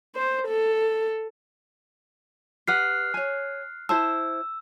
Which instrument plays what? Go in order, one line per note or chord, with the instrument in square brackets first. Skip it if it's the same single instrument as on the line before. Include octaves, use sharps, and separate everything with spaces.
[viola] C5
A4
[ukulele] G4 B4 F#5 [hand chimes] F6 F#6 C7
[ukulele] C#5 G#5
[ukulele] E4 C5 A5 [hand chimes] E6